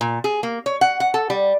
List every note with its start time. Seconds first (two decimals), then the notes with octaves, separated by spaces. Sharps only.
0.01 A#2
0.24 G#4
0.43 A#3
0.66 C#5
0.81 F#5
1.00 F#5
1.14 A4
1.30 G3